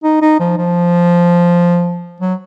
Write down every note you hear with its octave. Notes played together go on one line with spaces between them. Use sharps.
D#4
D#4
F3
F3
F#3